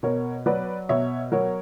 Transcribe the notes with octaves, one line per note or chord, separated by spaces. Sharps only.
B2 A#4 C#5
F#3 B4 D5
B2 C#5 E5
F#3 A#4 C#5